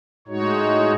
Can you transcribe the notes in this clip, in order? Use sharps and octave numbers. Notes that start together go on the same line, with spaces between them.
A2 G#3 D#4 F#4 C#5